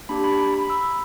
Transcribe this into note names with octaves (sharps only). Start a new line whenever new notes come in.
A#3 D4 G4 B5
B5
A#5
B5
E6